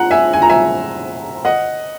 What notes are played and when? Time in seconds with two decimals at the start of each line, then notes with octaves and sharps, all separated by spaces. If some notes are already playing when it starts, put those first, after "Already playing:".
Already playing: F#5 A#5
0.11 E5 G#5
0.33 G#5
0.42 A#5
0.50 E5 G#5
1.45 D#5 F#5